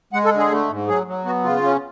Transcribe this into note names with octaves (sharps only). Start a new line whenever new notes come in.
G#3 F#5
A4
D3
G#4
A3
G#2
F#3 G#4
F#3
B3 F#4
C#3 F4
C#4